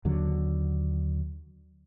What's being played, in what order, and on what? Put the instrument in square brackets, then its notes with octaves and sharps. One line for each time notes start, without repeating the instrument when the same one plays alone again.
[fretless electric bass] D#2 D3 F#3